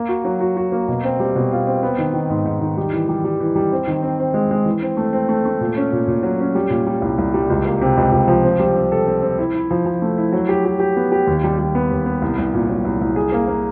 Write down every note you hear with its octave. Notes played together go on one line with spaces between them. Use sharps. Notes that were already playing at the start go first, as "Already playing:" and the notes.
Already playing: A#3
F#4
F#3
F#4
F#4
A#3
B2
C4
G3
B2
F4
C4
B3
D#3
D#3
G#2
G#2
D#3
G3
E3
G3
G3
E3
G3
C4
D#3
C4
C4
G#3
G#3
E3
C4
A3
C4
A3
A3
A#2
C#4
A#2
A#2
F#3
C#4
G3
A#2
G3
C2
C2
G3
C#2
A#3
C3
C#2
C#2
F3
C4
G3
C4
A4
C4
C4
E4
E4
F3
F3
A3
E4
F#3
G4
G4
G4
B3
G4
D#2
G3
G3
B3
D#2
B3
C2
C2
A#2
F#3
C2
C2
G#4
A#3
A#3